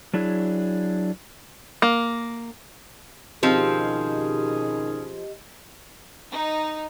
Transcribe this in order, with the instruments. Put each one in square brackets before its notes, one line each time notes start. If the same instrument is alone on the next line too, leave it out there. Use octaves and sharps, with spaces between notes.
[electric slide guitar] F#3 D4 E4 G#4
[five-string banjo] A#3
[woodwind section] B2 C#4 G#4 [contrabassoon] D#3 [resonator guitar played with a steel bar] F3 C4 [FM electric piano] G4 D#5
[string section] D#4